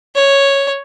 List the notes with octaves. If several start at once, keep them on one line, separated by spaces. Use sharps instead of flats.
C#5